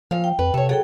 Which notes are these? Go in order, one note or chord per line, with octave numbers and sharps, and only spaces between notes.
A#2 F3 F5
G5
F2 B4
C3 A4 C#5
F#3 G#4 A4 G5